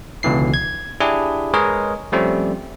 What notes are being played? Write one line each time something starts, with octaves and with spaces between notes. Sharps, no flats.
C#2 B2 D3 E3 C7
G#6
D4 E4 G4 G#4
G#3 G#4 A#4 B4 C#5 D#5
F3 G3 A3 C4 C#4